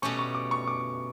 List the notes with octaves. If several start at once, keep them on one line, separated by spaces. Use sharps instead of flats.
B2 A3 C#4 G4 C#6
C#6
D6
C#6
D6